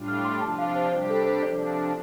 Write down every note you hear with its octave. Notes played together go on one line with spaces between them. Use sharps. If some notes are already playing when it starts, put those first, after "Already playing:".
Already playing: A2 G3 D4 F4
F6
D6
C6
C3 F3 D4 F4 A5
F5
C5
D5
C3 G3 D4 G4 C5
A4
C5
C3 F3 D4 D5